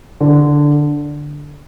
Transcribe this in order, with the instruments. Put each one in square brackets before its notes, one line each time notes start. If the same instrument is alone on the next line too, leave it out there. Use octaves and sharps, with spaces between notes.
[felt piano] D3